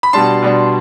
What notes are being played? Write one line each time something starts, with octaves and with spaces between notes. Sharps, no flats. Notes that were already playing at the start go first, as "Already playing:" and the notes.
B5
B2 G3 D4 A5 C6
B2 G3 D4